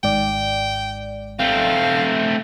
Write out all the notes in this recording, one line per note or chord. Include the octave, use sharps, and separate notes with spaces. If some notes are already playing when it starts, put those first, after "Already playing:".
G#1 G#2 D5 G5
A3 C4 F5